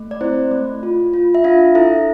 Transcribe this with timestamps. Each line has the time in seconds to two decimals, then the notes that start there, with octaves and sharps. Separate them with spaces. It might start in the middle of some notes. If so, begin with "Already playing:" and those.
Already playing: A3
0.11 D5
0.21 C4 E4 C5
0.51 A3
0.83 F4
1.13 F4
1.35 E5
1.44 D4 F4 F5
1.75 E4 A4 E5